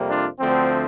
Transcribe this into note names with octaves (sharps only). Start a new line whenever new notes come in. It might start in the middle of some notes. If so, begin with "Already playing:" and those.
Already playing: F2 C3 G3 A#3
D4 F4
D2 D3 F3 A3 C4